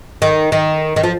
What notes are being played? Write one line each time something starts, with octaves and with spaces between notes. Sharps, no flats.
D#3
D#3
D#3
F3